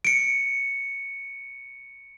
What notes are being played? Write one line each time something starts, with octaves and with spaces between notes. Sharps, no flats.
C#7 D7